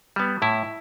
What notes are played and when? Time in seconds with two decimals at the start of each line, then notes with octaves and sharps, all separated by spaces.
0.16 G3 B3
0.42 A2 E4